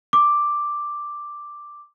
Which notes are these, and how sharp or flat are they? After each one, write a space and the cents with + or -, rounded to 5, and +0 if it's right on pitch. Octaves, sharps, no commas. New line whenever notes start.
D6 +5